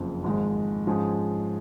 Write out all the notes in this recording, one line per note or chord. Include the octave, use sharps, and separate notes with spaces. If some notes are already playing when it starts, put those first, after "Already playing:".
Already playing: F#1 F2 C#3 F3
G#1 G#2 F3 G#3
G#2 F3 G#3 C#4 G#4